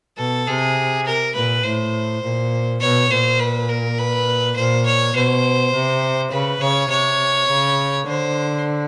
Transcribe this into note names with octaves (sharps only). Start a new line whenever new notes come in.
B2 A4
C3 G#4
A#4
A#2 B4
A2 C5
A#2
B2 C#5
A#2 C5
B4
A#4
B4
A#2 C5
C#5
B2 C5
C3
C#3 B4
C#3 C#5
C3 C#5
C#3
D3 C5